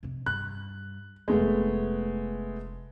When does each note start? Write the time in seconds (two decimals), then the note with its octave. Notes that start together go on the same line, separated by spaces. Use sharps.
0.03 F2 C3
0.26 G2 F#6
1.28 F1 G#3 A3 B3 F4